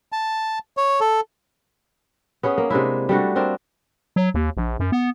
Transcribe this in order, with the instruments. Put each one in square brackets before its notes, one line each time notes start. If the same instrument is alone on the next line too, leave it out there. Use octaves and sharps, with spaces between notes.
[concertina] A5
C#5
A4
[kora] B3 C#4 G#4 B4
A#3
C3 G#3 D4 E4
G3 A3 D4 F#4
A#3 C4 D4 A#4
[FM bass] F#3
D#2
A#1
F#2
B3